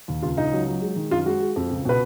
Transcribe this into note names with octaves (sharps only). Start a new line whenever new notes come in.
D#2
C#2 F4
C#2 D#4
F#3
F#3
G#3
D#3
F#2 F4
G#3 F#4
G#3
F2
C#2
B2 B4